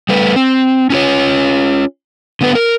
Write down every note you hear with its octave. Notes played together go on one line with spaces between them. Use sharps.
G3 A3 B4
C4
C#4 F4 C#5
D3 B3 B4
A#4